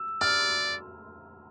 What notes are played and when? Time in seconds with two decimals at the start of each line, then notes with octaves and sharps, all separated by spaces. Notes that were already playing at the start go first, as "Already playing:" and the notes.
Already playing: E6
0.21 D5 F6